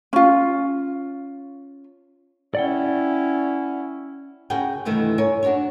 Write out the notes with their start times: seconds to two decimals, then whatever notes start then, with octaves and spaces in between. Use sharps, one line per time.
0.13 C#4 F4
2.55 C#4 E4 D5 F#5 G5
4.50 C#3 F#4 G#4 A#4 G5
4.85 G2 C3 D#3 E3 A3
5.18 A#4 C#5 G#5
5.43 D4 F#4 G#4 A#4 C#5